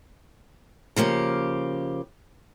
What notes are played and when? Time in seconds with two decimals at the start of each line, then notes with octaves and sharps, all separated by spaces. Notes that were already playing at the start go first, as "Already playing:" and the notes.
0.96 C#3 F3 A#3 G4